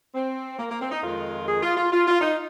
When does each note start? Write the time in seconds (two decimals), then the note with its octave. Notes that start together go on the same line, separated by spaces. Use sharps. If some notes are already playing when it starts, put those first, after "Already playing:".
0.15 C4
0.59 A#3
0.71 A#3
0.81 C4
0.92 D#4
1.03 F2 D#3 G#3 F4
1.48 G#4
1.62 F4
1.77 F4
1.92 F4
2.07 F4
2.21 D#4